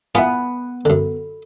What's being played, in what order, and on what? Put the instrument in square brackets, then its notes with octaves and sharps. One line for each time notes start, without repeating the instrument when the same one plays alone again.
[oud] B3 [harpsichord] E4 F4 [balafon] G#5
[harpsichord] F#2 D3 [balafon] A4